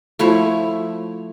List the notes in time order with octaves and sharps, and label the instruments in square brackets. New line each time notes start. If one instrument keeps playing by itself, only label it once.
[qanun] F3 A3 E4 C#5